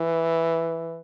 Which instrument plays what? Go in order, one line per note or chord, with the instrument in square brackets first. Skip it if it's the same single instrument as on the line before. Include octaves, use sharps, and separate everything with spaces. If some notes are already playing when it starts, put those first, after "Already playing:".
Already playing: [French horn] E3